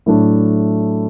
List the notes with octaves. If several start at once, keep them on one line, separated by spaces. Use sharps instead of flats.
A2 F#3 A3 D4